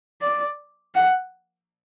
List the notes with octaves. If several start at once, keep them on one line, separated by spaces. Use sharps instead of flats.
D5
F#5